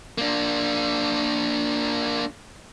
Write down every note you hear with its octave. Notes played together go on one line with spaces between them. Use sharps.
A#3 D4